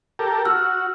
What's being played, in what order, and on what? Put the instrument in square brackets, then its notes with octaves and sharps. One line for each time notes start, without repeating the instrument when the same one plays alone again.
[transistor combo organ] G4 A4 A#4
[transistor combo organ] F#4 [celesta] E6 F6